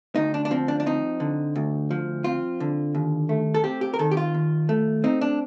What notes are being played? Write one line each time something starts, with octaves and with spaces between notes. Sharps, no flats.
D2 D#4
D4
D4
F3 C4
D4
D4
C4 D#4
D3
D2
F3
C4 F4
D3
D#2
A3
A4
C4 G4
G4
A#4
D#3 A4
G4
F4
D#2
A3
C4 D#4
D4